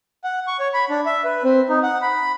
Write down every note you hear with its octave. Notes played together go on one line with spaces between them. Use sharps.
F#5
C#6
C#5
B5
D4
E5
B4
C4
D#4
F#5
B5